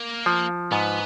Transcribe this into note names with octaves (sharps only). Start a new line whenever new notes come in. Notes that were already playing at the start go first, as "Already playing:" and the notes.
Already playing: A#3
F3
G#2 B3